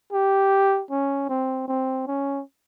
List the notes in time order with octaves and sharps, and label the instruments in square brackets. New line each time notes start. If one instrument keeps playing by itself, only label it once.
[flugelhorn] G4
C#4
C4
C4
C#4